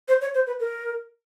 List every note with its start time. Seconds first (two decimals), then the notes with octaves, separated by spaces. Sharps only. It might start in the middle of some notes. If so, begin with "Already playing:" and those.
0.08 C5
0.21 C#5
0.35 C5
0.47 B4
0.60 A#4